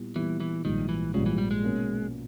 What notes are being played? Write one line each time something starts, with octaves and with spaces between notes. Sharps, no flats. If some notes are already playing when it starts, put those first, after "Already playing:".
Already playing: A#2 G3 B3 E4 G4
A#2 E3 G3 B3 E4 G4
E3
A#1 G#2 D#3 G3
E3
A#1 G#2 C#3 G3
E3
G3
G#3
B2 A#3 C#4